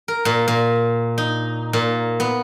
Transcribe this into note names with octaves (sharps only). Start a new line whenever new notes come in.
A#4
A#2
A#2
D#4
A#2
B3